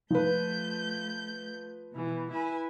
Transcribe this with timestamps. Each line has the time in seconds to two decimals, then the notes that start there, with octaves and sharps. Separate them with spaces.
0.11 F3 A3 B4 G6
1.91 B2 E3
2.30 E4 B4 G#5